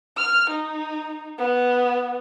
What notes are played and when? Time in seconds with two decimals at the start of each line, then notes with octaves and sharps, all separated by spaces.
0.17 F6
0.50 D#4
1.38 B3